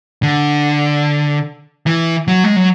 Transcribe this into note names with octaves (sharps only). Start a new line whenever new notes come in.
D3
E3
F#3
G#3
F#3